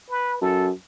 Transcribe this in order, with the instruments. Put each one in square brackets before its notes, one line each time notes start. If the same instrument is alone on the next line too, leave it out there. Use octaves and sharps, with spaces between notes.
[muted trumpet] B4
[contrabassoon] F#2 [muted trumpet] A4